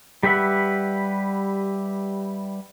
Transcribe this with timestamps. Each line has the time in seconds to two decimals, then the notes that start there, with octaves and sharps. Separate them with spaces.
0.23 G3 G4 B4 E5 F#5